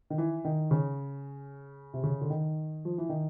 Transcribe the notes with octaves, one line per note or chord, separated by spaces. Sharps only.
D#3
E3
D#3
C#3
C3
C#3
D3
D#3
F3
E3
D#3